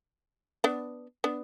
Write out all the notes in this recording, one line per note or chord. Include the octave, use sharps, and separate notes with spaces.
B3 D4
B3 D4